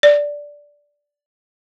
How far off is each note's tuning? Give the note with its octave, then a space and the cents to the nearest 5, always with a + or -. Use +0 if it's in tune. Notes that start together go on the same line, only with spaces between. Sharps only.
D5 -10